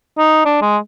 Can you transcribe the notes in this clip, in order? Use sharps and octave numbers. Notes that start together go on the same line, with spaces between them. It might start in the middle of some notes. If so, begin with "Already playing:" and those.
D#4
D4
G#3